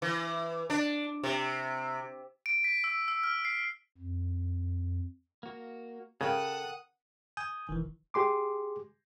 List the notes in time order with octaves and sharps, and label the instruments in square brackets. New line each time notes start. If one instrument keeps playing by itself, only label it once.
[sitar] E3
D4
C3
[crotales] D7
B6
E6
E6
F6
C7
[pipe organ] F2
[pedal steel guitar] A#3 F#4
[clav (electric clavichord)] C#3 [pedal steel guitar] A4 [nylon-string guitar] A#4 G5 [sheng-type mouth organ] F#5 D#6
[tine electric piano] G#5 D#6 G6
[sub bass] E1 [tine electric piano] D#3 E3
[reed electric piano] G4 G#4 C6 D6